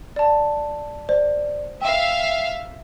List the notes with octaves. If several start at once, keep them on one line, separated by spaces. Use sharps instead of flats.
D5 A5
C5 D5
E5 F5 G5